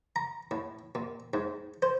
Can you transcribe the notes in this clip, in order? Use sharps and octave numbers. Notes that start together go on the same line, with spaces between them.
A#5
A2
A#2
G#2
C5